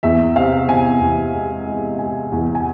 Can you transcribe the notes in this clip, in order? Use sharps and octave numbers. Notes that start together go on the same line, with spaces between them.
E2 E5
C3 F5
C3 G#5
E2
G#3
G#3
G#3 G#5
E2
G#5